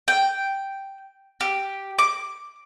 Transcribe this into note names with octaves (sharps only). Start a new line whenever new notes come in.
G5
G4
D6